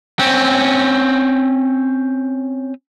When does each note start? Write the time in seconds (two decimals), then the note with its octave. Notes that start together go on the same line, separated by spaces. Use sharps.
0.19 C4 C#4